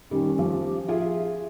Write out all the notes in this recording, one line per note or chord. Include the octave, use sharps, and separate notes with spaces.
D#3 G3 C#4
F3 G4
F4 G#4 E5